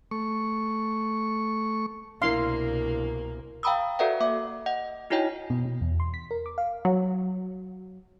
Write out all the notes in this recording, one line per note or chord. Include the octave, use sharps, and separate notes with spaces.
A3 C#6
C2 B2 A#3 D4 E4 A#4 F5 C6
F5 G5 A#5 B5 D#6 E6
F#4 A4 B4 D5 E5 F#5
A#3 E5 D6
D#5 F#5
D#4 E4 F#4 C#5 D#5 G5
B2
B2
E2
C6
B6
A#4
D6
F5
F#3